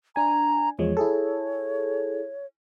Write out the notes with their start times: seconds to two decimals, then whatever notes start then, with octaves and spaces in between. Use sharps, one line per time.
0.16 D4 G#5 A#5
0.79 E2 F3 G#3 C#5
0.97 E4 G#4 A4